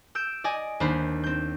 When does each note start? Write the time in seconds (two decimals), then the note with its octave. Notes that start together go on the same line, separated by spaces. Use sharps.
0.15 E6 G6 D7
0.44 D5 D#5 G#5 D6
0.80 D#2 A#3 D4 C5 B5
1.24 C4 G6